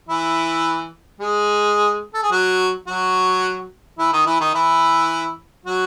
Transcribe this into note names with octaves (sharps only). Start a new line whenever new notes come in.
E3 E4
G#3 G#4
A4
G#4
F#3 F#4
F#3 F#4
E3 E4
D#3 D#4
E3 E4
D#3 D#4
E3 E4
F#3 F#4